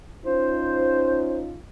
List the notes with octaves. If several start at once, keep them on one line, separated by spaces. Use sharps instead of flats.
C#4 D#4 F4 C5